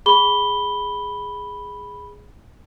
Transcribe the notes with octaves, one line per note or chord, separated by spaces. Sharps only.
G#4 B5 G7